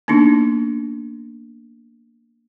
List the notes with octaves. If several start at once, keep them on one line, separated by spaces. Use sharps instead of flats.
A#3 B3 D4 D#4